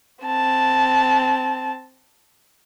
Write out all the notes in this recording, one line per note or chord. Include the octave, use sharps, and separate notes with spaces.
C4 A5